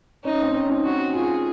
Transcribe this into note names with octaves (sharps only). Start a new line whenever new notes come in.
C#4 D#4
C4
C#4
D#4
F#4
F4 G#4